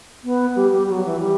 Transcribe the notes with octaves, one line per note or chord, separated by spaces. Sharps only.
B3
G3
G3
F#3
E3
G3